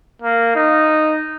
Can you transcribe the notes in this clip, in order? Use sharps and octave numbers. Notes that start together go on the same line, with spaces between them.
A#3
D#4